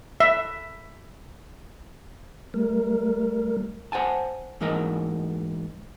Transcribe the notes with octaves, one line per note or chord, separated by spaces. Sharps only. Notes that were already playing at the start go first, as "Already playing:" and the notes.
E5
G3 A3 A#4
C5 F#5 G#5 A5
G#2 E3 A#4 D#5